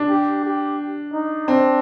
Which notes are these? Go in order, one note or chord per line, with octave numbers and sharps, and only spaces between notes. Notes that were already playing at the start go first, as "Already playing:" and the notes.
Already playing: D4
G4
G4
D#4
C4 D4